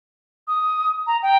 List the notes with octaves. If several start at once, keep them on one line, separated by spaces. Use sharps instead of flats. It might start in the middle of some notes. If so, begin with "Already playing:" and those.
D#6
A#5
G5